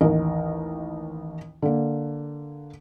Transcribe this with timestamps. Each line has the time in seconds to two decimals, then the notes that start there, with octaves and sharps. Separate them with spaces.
0.01 A1 D#2 A#4 D#5
1.62 D3 A#3